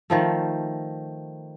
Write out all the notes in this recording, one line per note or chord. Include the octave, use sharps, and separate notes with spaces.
D#3 F3 A3